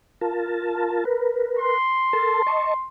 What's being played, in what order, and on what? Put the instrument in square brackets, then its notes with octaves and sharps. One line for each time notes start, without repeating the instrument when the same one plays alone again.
[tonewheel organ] F4 A#4 A5
A#4 B4
[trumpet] C6
[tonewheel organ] A4 A#4 A5
D#5 A5 C#6